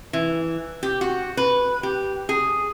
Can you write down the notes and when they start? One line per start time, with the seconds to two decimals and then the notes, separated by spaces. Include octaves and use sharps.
0.13 E3
0.83 G4
1.01 F#4
1.37 B4
1.83 G4
2.29 G#4